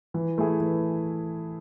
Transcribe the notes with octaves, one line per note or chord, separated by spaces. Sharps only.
E3
A3 E4 G#4
E3